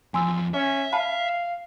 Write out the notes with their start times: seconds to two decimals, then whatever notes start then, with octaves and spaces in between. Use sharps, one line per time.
0.14 E2 F3 G#5 C6 E6
0.54 C#4 E5
0.93 F5 A5 B5